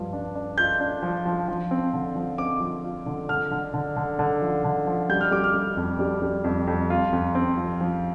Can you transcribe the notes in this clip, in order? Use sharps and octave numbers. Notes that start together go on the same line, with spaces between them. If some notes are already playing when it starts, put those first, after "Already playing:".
Already playing: G2 F3
D4
D4
F4 G6
D4
F3
F3
F3
C4
D3
F3
C4 D6
F3
F4
D3
D3 F6
D3
D3
D3
D3
F3
D3
F3
G3 G6
F6
G3 D6
F6
G3
F2
G3
G3
F2
F2
F4
F2
C4
F3
F3